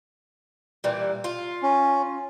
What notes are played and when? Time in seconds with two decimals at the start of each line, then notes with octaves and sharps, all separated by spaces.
0.84 A#2 E3 G3
1.24 F4
1.63 C#4